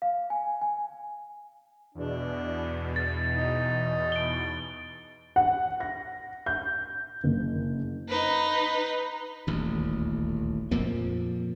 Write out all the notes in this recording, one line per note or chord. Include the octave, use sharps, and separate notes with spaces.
F5
G#5
G#5
E2 B2 D4
A6
D#4
D7 G7
F#5
A#6
G6
F#1
D#4 B4
D#1 A1 D2
F2 A#2 F3 A#3